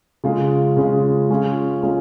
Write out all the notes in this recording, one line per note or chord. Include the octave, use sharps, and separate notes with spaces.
C#3 G#3 F4
C#3 G#3 F4
G#3 C#4 F4
G#3 C#4 F4